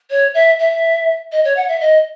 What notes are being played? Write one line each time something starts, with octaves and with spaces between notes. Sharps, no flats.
C#5
E5
E5
D#5
C#5
F#5
E5
D#5